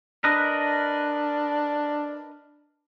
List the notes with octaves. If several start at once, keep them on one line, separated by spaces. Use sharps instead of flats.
D4 A#4 B4 D#5